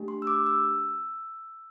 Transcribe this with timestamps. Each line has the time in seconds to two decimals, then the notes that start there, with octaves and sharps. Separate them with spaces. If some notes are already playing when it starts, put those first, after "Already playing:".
Already playing: A3 D4 G4
0.08 C6
0.22 E6
0.27 D6
0.46 E6